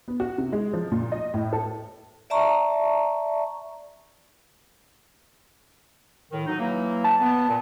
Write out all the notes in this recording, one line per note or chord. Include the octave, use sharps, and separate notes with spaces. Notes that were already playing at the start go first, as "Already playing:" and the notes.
B3
F#4
C3
G#3
F3
A#2
D#5
A2
A4
D5 E5 A5 A#5 C#6
A2 D#3
F#3 D#4
E3 F#3 A#3
A5
B3
A#2